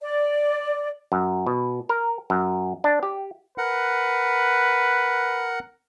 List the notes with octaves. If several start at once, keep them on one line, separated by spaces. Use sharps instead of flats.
D5
F#2
B2
A#4
F#2
D4
G4
A#4 B4 F#5